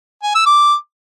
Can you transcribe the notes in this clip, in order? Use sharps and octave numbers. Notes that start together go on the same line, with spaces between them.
G#5
E6
D6